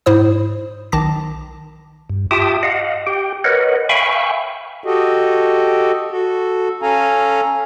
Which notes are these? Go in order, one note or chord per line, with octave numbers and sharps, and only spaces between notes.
G#2 E4 C5 D#6
B1 D#3 A5 D6 A#6
G2
F4 G4 E5 G5 A5 D#6
D#5 F5 F#5
G4 G5
A#4 B4 C#5 D#5 F#5
E5 F5 G5 G#5 B5 C#6
F#4 G4 A4 D#5
F#4 A4
C#4 A4 F5 G#5 A#5